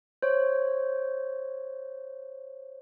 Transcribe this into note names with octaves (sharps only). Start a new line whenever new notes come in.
C5 C#5